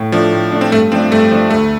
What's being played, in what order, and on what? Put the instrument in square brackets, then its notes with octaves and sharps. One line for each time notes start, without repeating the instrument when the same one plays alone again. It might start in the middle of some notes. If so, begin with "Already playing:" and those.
Already playing: [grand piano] A2
[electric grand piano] F3 [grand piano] A3 D4
[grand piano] A2
A3 D4
[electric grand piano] C4
[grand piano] G2 [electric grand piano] A3
[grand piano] F3 A3 D4 [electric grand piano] C4
[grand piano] G2 [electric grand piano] A3
[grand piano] F3 A3 D4
[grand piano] D2 [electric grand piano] A3